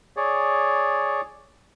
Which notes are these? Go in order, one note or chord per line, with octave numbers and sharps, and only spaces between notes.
G#4 C#5 D5